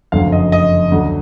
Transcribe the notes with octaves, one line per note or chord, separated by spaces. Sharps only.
F#1 F2 D3 F#3 A3 F5
D#5
D#5
D2 D3 F#3